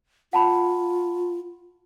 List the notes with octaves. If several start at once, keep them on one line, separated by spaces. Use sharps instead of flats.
F4 F#5 A5 B5